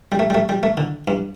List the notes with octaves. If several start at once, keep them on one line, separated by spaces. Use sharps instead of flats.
G3
A3
G3
A3
G3
A3
D3
G2